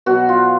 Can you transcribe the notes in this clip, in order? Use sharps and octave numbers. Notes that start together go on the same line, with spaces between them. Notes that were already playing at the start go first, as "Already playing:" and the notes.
B2 F#3 B3 F#4
F4